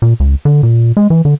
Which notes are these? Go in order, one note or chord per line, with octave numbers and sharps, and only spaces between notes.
A#2
C#2
D3
A#2
G#3
E3
D3